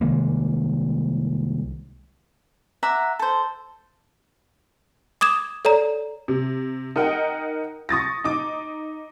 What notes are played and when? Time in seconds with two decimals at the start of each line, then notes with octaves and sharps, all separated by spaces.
0.01 C2 D#3 G#3 A#3
2.83 E5 F#5 A#5 D6
3.19 A4 C5
5.21 D6 D#6 G#6 E7
5.65 A4 C#5 D5 A#5
6.28 C3
6.96 D#4 A#4 D#5 F#5 G5
7.89 C#6 D#6 A6 A#6
8.24 D#4 D6